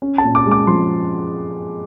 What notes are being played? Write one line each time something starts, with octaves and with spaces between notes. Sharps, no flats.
C#4
A5
A#2
D6
G#3
D6
F3 C6